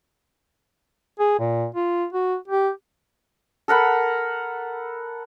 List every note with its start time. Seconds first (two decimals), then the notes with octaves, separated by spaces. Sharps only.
1.19 G#4
1.39 A#2
1.75 F4
2.12 F#4
2.48 G4
3.68 A4 A#4 F#5 B5